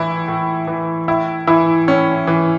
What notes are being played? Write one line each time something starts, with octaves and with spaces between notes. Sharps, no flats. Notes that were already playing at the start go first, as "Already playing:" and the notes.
Already playing: A2 E3 E4
A2
E3
A2 E4
E3 E4
A2 C#4
E3